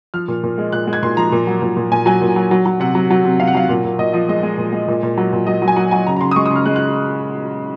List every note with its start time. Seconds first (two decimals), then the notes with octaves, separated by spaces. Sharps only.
0.14 F3 F6
0.28 A#2
0.43 A#2
0.58 G#3
0.72 A#2 F#6
0.87 G#3
0.93 G#6
1.02 A#2 C6
1.17 F3 A#5
1.32 A#2
1.47 F#3
1.62 A#2
1.77 A#2
1.91 A#2 G#5
2.06 F#3 G#5
2.22 A#2
2.36 F#3
2.51 F#3
2.66 F#3
2.80 C3 F#5
2.95 F#3
3.10 F#3
3.25 C3
3.40 C3 F5
3.48 F#5
3.55 F#3 F5
3.69 A#2
3.84 A#2
3.99 A#2 D#5
4.13 F3 D#5
4.29 G#3 D#5
4.43 G#3
4.58 A#2
4.73 G#3
4.88 A#2
5.03 A#2
5.17 F#3
5.33 A#2
5.47 F#3 D#5
5.62 F#3
5.68 G#5
5.76 F#3 F#5
5.91 F#3 G#5
6.06 C#3 A#5
6.16 A#5
6.21 C#3 C6
6.31 D#6
6.36 G#3 C#6
6.46 D#6
6.50 C#3
6.56 F6
6.66 G#3 F#6
6.76 F#6